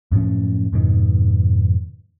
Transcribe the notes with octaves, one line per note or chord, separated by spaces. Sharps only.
F#2 A2 F3 C#4
F2 G#2 B2 D#3